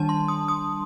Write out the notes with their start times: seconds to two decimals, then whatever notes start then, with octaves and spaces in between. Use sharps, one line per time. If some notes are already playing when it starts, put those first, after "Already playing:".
Already playing: D#3 G3 D4 A5
0.09 C6
0.28 D#6
0.48 D#6